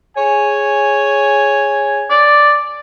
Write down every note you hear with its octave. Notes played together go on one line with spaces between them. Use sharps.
G#4 C#5 G#5
D5